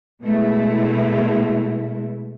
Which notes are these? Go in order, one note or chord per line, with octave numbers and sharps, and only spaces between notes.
B2 G#3 A3 E4